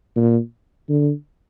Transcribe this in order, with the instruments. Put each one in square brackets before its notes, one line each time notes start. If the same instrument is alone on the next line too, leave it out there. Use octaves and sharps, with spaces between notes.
[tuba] A#2
D3